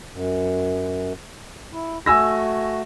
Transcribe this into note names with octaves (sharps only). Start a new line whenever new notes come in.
F#2
E4
A3 F#4 G#5 E6 A#6